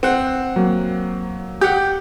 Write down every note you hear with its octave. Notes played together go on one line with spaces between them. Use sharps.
C4 F#5
F#3 A#3
G4 F#5 G6